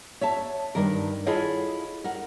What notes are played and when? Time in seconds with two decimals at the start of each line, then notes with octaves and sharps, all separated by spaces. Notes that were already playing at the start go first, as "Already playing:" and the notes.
0.21 C#5 E5 A5
0.75 G2 D#3 A#4
1.26 E4 F4 G#4 A4 C#5 D#5
2.04 A#4 F#5